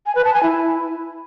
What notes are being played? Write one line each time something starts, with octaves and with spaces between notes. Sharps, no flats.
G#5
B4
A5
G#5
E4